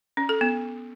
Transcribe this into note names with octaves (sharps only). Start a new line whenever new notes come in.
C#4
A4
B3